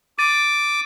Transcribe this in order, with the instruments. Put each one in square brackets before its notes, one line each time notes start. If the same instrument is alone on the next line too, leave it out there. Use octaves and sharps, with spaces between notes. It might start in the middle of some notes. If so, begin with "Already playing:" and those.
[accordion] D6 [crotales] A6 D#7